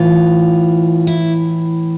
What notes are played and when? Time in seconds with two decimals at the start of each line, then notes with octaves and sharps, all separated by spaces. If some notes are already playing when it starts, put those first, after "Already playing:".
Already playing: A2 E3 F4
1.07 E4